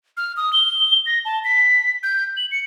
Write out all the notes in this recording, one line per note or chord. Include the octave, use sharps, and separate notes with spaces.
F6
D#6
G7
A#6
A5
B6
G6
F#7
C#7